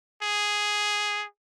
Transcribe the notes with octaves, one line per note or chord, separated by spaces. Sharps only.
G#4